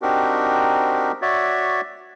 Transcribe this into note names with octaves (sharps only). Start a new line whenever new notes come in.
C4 D4 D#4 F#4 G4 A#4
F#4 C#5 D5 E5